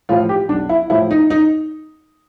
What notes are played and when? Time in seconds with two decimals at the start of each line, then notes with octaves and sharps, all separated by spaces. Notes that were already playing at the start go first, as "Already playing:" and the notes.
0.09 A2 F3 F4
0.29 G4
0.49 B1 D4
0.69 E4
0.90 A2 F3 E4
1.11 D#4
1.30 D#4